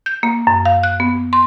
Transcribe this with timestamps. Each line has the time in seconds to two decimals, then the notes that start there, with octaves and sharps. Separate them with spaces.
0.06 G6
0.23 A#3
0.47 F#2
0.65 F5
0.83 F#6
1.00 B3
1.33 C6